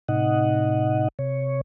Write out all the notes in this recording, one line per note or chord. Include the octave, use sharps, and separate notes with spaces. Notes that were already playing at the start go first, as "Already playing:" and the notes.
A2 C3 D#4 D#5 F#5
C3 C#5